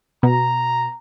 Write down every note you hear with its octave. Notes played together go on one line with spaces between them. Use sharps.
B2 A#5